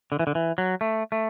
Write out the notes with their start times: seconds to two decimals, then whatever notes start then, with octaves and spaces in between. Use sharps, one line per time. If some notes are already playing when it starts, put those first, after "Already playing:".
0.12 D3
0.19 E3
0.27 D3
0.35 E3
0.58 F#3
0.81 A3
1.12 A3